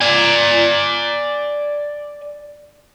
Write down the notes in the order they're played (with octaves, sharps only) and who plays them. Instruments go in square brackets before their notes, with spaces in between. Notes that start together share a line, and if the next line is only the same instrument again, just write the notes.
[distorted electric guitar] D5 G#5